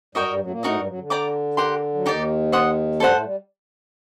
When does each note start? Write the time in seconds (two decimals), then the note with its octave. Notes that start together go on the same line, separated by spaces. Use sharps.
0.15 G2 G3 F#4 A#4 D#5 G5
0.27 G2 G3
0.39 F#2 F#3
0.47 A3
0.50 A#2 A#3
0.63 A2 A3 D#4 F#4 A#4 D#5
0.75 G2 G3
0.87 F#2 F#3
0.98 D3
1.10 D5 G5 A#5 D6
1.57 G4 A#4 F#5 C6
1.94 F#3
2.05 D#2 D#3 D#4 G4 D5
2.52 C5 F#5 C6 D#6
2.99 G2 G3 A4 C5 F#5
3.11 A2 A3
3.24 G3